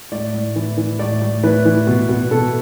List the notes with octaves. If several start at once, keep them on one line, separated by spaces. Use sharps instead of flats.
A2 D5
A2
E3
E3
A2 D5
A2
E3 B4
E3
B2
B2
B2 A4